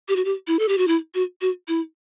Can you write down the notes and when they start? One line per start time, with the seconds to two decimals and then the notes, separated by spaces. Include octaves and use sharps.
0.08 G4
0.16 F#4
0.25 G4
0.47 E4
0.59 A4
0.68 G4
0.78 F#4
0.88 E4
1.15 F#4
1.41 F#4
1.68 E4